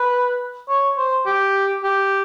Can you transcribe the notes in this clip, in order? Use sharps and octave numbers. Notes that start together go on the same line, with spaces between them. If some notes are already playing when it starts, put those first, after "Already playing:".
Already playing: B4
C#5
C5
G4
G4